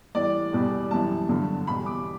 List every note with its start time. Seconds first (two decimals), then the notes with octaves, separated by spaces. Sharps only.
0.15 A2 E3 G3 D5
0.53 E2 B2 G3
0.91 F#2 E3 G3 A5
1.29 G2 D3 F#3
1.67 E2 B2 G3 B5
1.86 D6